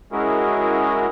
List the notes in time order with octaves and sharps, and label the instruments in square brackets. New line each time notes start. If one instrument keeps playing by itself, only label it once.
[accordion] G#3 C#4 E4 F#4 G#4 A#4